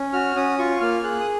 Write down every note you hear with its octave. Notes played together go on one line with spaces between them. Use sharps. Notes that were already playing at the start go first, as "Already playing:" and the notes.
Already playing: C#4
F#4 F6
C#4 D#6
F4 C#6
A#3 F6
G#4 F#6
D#6